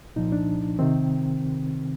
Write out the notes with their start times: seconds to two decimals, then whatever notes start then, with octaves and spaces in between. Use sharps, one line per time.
0.16 C2 A#2 F3 D#4
0.32 D4
0.79 C3 D#3 C4